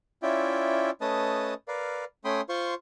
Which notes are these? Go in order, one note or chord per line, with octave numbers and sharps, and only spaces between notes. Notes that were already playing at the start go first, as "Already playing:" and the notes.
C#4 E4 F4 D5 E5 G5
A3 C#4 B4 D#5 A5 D#6
A#4 B4 D5 F5
A3 C#4 G5 B5 C6 D#6
F4 C5 C6 C#6